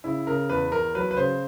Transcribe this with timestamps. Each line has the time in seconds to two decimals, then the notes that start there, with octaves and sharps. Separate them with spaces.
0.04 C#3 E4
0.27 C#3 A#4
0.50 E2 B4
0.72 E2 A#4
0.95 F#3 B4
1.11 B4
1.17 C#3 C5